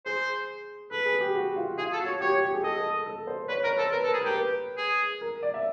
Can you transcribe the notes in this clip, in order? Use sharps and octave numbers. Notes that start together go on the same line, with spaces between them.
G#4 C5
A4 B4
G#4
G4
F#4
F4
F4 G#4
A4
F#4
C#5
G4 C#5
G4
G#4
A4 D#5
A4
A4
C5
B4 C#5
A#4 C#5
A4 C5
A#4 B4
A4
A#4
G#4
A#4
G4
B4
G#4
A#4
D5
E5